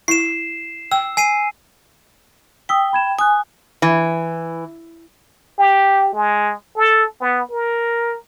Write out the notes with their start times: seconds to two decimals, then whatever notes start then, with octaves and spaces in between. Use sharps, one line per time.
0.08 E4 C7 E7
0.91 G5 E6
1.17 G#5 C7 D#7
2.69 G5 D#6 E6 B6
2.93 B5 G#6 E7
3.19 G#5 D#6 F#6
3.82 E3
5.59 G4
6.14 G#3
6.77 A4
7.21 B3
7.51 A#4